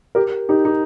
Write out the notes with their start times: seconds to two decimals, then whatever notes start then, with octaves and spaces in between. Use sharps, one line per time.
0.15 G4 A#4
0.49 D#4 G4
0.65 D#4 G4